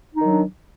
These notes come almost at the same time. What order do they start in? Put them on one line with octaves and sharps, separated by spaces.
D#4 D#3 F#3 D4